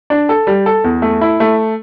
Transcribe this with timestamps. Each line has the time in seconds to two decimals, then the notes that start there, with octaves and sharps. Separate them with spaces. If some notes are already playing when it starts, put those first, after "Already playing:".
0.10 D4
0.29 A4
0.47 G3
0.66 A4
0.84 E2
1.02 A3
1.21 E4
1.40 A3